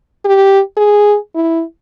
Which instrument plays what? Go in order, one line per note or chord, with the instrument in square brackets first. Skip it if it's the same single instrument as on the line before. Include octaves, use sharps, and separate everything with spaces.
[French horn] G4
G#4
E4